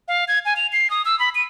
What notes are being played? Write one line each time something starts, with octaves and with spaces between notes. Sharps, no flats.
F5
G#6
G#5
F7
C7
D#6
E6
B5
D#7